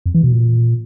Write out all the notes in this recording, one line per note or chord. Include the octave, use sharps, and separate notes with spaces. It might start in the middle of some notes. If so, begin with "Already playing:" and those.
F2
E3
B2
A#2